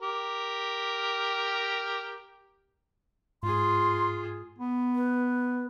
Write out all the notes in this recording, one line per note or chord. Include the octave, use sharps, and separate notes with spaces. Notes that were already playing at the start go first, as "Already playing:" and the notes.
G4 A#4
G#2 F4 G#4 C6
B3
B4